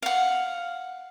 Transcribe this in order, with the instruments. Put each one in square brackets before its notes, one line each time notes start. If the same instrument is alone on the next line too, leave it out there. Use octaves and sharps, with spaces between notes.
[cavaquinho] F5 F#5